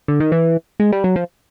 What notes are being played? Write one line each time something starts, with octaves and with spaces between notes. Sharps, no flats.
D3
D#3
E3
G#3
G3
F#3
F3